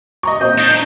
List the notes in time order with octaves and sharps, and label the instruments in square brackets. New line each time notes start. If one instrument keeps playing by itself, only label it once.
[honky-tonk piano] D#5 A#5 C#6
[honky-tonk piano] A#2 C4 D#5 [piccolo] G6
[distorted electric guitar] D4 D#4